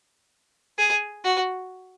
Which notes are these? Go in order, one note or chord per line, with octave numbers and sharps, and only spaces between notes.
G#4
F#4